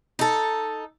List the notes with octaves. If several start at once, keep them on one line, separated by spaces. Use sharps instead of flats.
D#4 A4